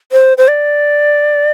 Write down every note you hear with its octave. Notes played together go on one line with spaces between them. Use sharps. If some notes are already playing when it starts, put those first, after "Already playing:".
C5
C5
D5